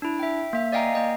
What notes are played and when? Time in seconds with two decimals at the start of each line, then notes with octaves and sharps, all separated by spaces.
0.02 D4 E4
0.19 E5 G5
0.53 A#3 E5
0.72 D5 D#5 F5 G5 G#5 A#5
0.93 A#3 D#5 F5